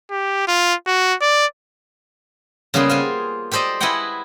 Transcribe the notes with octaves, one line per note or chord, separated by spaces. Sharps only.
G4
F4
F#4
D5
C#3 G3 A#3 B3 G#4 C6
F4 C5 G#5
G4 A4 C5 D5 D#5
E4 G#4 B4 D#5 F#5 G5